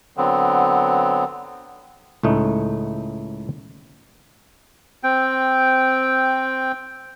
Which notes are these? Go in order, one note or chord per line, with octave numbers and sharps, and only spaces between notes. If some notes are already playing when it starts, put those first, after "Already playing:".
D3 F#3 B3 C4
C#2 A2 A3 D#4
C4 G5